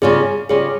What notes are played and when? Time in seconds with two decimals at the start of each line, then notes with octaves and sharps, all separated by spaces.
0.02 C#3 G3 C#4 F4 G#4
0.49 C#3 G3 C#4 F4 G#4